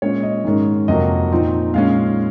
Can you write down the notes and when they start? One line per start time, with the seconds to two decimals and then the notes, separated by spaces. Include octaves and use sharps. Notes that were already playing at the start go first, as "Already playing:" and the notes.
0.02 A#2 G#3 C#4 C#5
0.23 D#5
0.45 G#2 D#3 G#3 C#4
0.88 F2 C3 F#3 A#3 D#5
1.32 A#2 F3 C4 D#4
1.74 A#2 G#3 C#4 F5